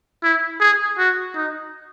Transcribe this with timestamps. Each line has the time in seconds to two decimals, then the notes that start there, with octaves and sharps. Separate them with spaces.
0.23 E4
0.60 G#4
0.98 F#4
1.35 D#4